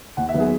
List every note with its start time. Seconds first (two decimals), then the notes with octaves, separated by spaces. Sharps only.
0.17 D#2 F#5
0.29 E5
0.34 D#3 F#3 B3
0.40 G#4